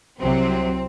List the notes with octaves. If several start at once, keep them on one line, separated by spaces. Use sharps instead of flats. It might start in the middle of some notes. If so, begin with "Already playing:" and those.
C2 C3 F#3 C4